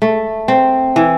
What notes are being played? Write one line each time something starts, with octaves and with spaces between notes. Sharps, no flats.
A3
C4
E3